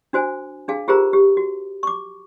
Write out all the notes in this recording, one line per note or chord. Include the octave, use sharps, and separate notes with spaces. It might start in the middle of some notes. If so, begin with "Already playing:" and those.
D4 F#4 C5 G#5
D4 G#4 F5 A5
F4 G4 G#4 A#4 C5 A#5
G4
F#4
C#6 D6